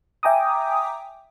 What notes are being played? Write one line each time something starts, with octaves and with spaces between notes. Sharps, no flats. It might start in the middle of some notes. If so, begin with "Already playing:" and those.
E5 G5 G#5 A#5 D6 D#6